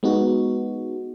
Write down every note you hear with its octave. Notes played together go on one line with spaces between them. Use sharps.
G#3 B3 D#4 F#4